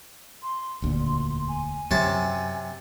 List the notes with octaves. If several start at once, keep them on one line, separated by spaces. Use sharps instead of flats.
C6
E1 D2 A#2
G#5
F#2 C3 F#3 A5